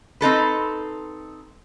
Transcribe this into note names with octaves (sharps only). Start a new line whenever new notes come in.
C4 D#4 A4 B4